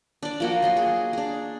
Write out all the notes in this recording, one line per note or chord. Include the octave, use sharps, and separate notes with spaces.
D4 D5
F3 A#3 F#4
F#3 D#5 C6
G#4
D4 G#4